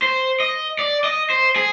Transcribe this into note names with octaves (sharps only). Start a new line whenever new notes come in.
C5
D#5
D5
D#5
C5
G#4